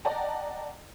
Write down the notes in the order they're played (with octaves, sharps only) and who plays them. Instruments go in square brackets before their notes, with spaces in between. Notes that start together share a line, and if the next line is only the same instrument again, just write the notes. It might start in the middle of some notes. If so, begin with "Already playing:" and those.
[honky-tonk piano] D5 D#5 F#5 G5 A5 A#5